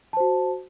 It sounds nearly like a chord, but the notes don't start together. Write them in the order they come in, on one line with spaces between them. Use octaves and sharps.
A5 C5 F#4